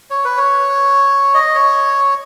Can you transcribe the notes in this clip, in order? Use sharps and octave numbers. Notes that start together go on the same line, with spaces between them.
C#5
B4
C#5
D#5
C#5